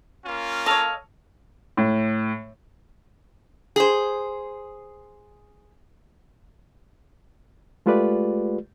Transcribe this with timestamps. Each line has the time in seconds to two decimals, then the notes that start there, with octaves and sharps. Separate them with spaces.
0.25 A#3 C#4 F4
0.66 A4 C#5 D#5 F5
1.77 A2
3.76 G#4 C5
7.86 G#3 A3 F4 G4 B4 D5